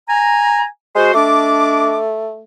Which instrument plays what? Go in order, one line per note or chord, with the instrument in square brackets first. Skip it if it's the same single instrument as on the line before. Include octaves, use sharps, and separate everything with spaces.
[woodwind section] G#5 A#5
[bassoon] G#3 [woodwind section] F#4 C5
[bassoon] A3 [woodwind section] D4 D#5 D6